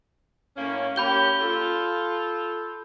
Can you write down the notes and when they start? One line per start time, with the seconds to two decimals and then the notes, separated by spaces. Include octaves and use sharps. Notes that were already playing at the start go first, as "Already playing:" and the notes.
0.56 A2 A#3 C#4
0.96 A#3 C#4 G4 B5 G6 G7
1.39 F4 A4